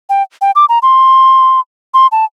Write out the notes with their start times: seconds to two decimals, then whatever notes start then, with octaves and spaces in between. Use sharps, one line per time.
0.10 G5
0.41 G5
0.56 D6
0.69 A#5
0.82 C6
1.94 C6
2.12 A5